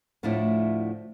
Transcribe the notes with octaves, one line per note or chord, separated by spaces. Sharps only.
D2 A2 F3 A3 D4 E4